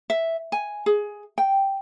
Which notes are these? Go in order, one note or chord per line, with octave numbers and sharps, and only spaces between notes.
E5
G#5
G#4
G5